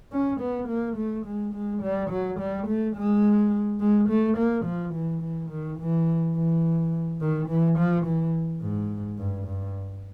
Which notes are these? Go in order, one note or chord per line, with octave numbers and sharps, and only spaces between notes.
C#4
B3
A#3
A3
G#3
G#3
G3
F#3
G3
A3
G#3
G#3
A3
A#3
F3
E3
E3
D#3
E3
E3
D#3
E3
F3
E3
G#2
G2
G2